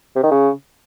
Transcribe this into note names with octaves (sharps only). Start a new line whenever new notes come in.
C3
D#3
C#3